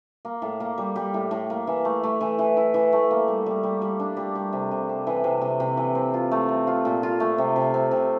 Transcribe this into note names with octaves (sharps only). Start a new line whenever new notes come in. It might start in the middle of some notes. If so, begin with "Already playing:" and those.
A#3
A2
A#3
G3
G3
A2
A2
A#3
E3
A3
A3
E3
E3
E4
E3
A3
A#3
G3
G3
G3
G3
D4
G3
G3
C3
C3
C3
E3
C3
C3
C3
E3
C4
F4
A3
C4
F4
A#2
F4
A3
C3
C3
C4
C3